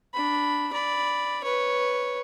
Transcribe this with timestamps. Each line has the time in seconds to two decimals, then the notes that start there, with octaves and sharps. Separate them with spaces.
0.13 D4 B5
0.72 D5 B5
1.43 B4 C#5